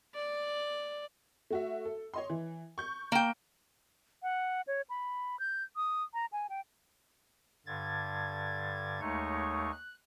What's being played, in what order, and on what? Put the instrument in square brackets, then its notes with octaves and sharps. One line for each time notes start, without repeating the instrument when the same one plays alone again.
[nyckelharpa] D5
[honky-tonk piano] A3 F#4 E5
A4
C#5 D#5 C6
E3
C#6 G6
[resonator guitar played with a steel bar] A#3 G5
[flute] F#5
C#5
B5
G6
D#6
A#5
G#5
G5
[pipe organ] G2 D3 G#6 A6
D#2 G#3 A3 D#4 C#5 C#6
F#6